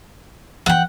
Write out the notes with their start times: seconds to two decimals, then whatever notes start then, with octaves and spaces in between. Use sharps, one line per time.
0.66 E3 D4 F#5 G5